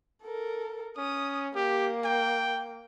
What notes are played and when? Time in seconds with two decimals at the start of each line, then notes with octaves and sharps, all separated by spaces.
0.23 A4 A#4
0.98 C#4 D#6
1.55 A#3 G4
2.04 G5